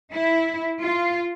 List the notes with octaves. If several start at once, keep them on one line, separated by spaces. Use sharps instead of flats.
E4
F4